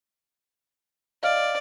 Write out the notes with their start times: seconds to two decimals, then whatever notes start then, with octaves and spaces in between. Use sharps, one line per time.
1.23 D5 D#5 F5 F6